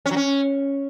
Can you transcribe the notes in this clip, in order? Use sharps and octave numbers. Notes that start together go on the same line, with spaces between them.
C#4
F#3
C#4